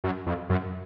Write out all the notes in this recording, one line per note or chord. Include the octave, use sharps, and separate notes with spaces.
F#2
F2
F#2